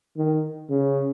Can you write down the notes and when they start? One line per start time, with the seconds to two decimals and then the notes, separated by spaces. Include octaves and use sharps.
0.17 D#3
0.70 C#3